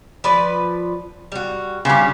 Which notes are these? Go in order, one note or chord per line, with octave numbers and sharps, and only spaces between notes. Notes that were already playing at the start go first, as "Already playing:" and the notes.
F3 B4 D5
G3 F#4
C#3 G3 C4 F#4